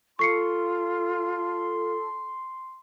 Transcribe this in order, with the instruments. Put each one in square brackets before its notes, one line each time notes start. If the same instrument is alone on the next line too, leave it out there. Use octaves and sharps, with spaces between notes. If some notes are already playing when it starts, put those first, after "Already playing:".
[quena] F4 [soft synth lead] A4 [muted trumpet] C6 [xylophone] C#6 C7 C#7